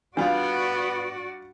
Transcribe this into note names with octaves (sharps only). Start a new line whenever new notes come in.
G3 B3 D4 F4 F#4 D5